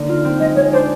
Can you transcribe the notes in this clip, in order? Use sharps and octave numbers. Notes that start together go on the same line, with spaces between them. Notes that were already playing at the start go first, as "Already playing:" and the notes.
Already playing: D3 A#3 D#4
F4
C4
G#3 D#5
G#3 C#5
D4 C5